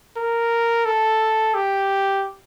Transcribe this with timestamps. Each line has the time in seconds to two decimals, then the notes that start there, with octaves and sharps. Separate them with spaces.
0.17 A#4
0.85 A4
1.54 G4